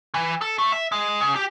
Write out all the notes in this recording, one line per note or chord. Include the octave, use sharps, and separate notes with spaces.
E3
A4
A3
E5
G#3
C#3
G4